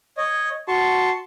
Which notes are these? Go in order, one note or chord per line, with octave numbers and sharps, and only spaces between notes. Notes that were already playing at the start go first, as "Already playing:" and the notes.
C#5 D#5
F#4 A5 C6 C#6